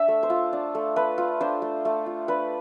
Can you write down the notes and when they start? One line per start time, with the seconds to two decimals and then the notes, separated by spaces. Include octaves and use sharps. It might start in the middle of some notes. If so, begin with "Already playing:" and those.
Already playing: D4 E5
0.08 A3
0.23 C5
0.30 F4
0.53 D4
0.75 A3
0.96 A3 B4
1.18 F4
1.41 D4 C5
1.62 A3
1.85 A3
2.06 F4
2.28 D4 B4